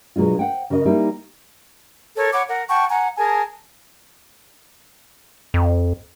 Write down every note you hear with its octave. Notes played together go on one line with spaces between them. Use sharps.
B2 F#3 G#3 D4 F4
C5 F#5 G5
C#3 A#4 C#5 D#5
G3 A#3 D#4 E4
A4 A#4 C#5
C#5 F#5 B5 D6
A#4 F#5
F#5 G5 A5 C#6
F#5 G#5 A#5
G#4 A#4 G#5 A5
F2